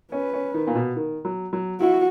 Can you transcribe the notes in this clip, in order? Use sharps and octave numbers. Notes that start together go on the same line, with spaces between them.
C#4 B4
C#4
D#3
A#2
B2
D#3
F#3
F#3
E4 F#4